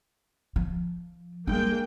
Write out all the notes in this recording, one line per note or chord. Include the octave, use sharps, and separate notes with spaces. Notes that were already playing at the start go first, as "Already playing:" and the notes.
F3
G3 G#3 A#3 D4 G5